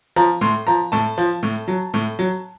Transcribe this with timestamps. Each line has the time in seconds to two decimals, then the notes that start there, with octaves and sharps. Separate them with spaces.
0.16 F3 A#5
0.41 A2 C6
0.67 F3 A#5
0.92 A2 A5
1.18 F3
1.43 A2
1.68 F#3
1.94 A2
2.19 F#3